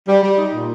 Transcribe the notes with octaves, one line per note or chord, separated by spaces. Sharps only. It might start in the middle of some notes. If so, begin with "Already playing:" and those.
G3
G3
D#4
A#2